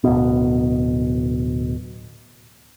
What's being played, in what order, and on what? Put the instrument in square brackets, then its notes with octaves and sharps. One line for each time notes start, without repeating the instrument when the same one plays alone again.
[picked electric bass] D1 B2